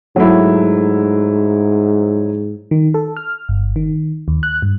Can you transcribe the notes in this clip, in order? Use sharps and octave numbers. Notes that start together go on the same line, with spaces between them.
G#2 F#3 A3 E4
D#3
A4
F6
G1
D#3
D#2
F#6
G2